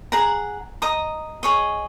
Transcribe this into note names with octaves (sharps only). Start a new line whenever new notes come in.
G#4 F#5 A#5
D#5 A#5 D#6
G#4 C#5 D#5